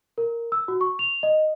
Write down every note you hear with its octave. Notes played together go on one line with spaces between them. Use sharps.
A#4
E6
F#4
C#6
F7
D#5